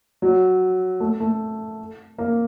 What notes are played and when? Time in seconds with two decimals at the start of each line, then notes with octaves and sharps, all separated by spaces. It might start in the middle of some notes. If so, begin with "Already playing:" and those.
0.22 F#3
1.00 A3
1.20 A3
2.18 A#3